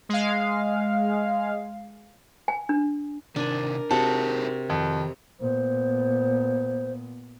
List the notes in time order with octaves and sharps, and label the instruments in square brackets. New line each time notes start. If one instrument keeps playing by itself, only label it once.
[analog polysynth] G#3 F5
[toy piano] G#5
D4
[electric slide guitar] C3 D#3 [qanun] D4 G#5 [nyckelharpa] A#4
[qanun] C3 F#4 [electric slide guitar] D#4 G#4 A4 [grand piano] A5
[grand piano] F2 [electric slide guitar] D#3
[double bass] A#2 B3 [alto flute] C5